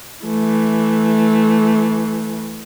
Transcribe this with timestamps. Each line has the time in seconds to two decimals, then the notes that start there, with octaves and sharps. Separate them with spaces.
0.25 E3 A3